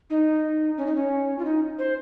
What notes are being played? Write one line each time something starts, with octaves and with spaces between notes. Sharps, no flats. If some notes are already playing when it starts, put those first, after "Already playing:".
D#4
C#4
D#4
C#4
F4
D#4
C5